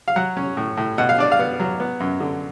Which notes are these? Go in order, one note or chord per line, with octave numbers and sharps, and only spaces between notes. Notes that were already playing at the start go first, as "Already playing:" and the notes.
F5
F#3 F#5
C#4
A2
A2
B2 F#5
F5
D4 D5
F5
B3
F#3
B3
F#2
D3